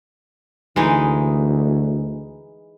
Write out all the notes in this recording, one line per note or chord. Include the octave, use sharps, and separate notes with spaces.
D2 E3 G#3 D#4